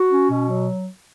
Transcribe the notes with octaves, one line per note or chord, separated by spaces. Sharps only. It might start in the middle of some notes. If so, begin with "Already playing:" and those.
Already playing: F#4
C#4
B2
F#3